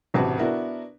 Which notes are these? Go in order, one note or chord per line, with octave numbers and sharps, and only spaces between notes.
E1 A1 C3 F#4 F#5 A5
B3 D4 E4 F#4 A#4